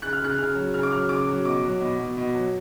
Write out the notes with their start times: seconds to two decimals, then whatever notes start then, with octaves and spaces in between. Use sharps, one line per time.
0.02 C#3 F#6
0.13 F6
0.21 C#3 F#6
0.38 C#3 F6
0.55 F#3
0.74 C#3 F6
0.83 D6
0.91 F#3 F6
1.09 C#3 D6
1.27 F#3
1.45 B2 D6
1.63 F#3
1.81 B2
1.99 B2
2.17 B2
2.34 F#3